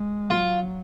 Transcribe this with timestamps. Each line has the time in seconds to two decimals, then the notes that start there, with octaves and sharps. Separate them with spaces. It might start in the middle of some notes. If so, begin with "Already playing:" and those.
Already playing: G#3
0.30 F#3 F4